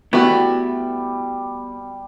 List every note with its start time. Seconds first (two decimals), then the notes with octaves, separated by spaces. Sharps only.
0.13 G3 A3 B3 E4 F#4